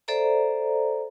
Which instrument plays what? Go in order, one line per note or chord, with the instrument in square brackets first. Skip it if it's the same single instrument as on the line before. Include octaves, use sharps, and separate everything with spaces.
[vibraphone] A4 C5 D5 E5 A#5